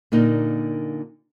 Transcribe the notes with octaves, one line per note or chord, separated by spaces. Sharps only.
A#2 D3 A#3 D#4